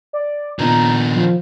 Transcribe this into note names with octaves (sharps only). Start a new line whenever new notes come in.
D5
A#2 D#3 B3 D4 D#4 A#5
F3